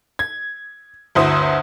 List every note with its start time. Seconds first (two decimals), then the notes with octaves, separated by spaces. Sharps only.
0.19 G#6
1.15 G1 D2 E4 C5 D#6